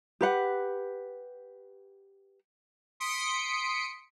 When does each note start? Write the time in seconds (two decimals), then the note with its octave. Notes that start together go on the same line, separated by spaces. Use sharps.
0.21 G4 B4 F#5
3.00 C6 D#6 B6 C#7 D7